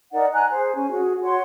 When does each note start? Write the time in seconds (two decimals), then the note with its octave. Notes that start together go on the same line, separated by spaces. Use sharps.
0.12 D#4 A#4 D5 F#5
0.33 G#5 A#5 F#6
0.49 G#4 C5
0.76 C#4 G#5
0.91 F#4 G#4
1.23 F#4 C#5 F#5 C6